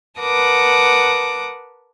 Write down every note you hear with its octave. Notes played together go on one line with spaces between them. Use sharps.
A#4 B4 F#5 A5 D6 D#6